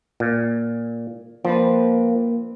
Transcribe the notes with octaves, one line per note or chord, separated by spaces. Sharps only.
A#2
F3 A#3 C4 D4 B4